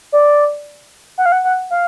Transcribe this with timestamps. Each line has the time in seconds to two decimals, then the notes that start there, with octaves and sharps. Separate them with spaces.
0.12 D5
1.18 F#5
1.26 F5
1.32 F#5
1.44 F#5
1.71 F5